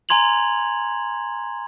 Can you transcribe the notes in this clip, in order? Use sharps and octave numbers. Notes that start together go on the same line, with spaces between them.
G#5 A#5 C6 G#6 F7 F#7